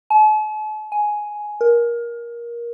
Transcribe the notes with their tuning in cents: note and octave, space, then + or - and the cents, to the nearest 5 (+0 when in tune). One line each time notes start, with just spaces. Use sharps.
A5 -45
G#5 +10
A#4 +20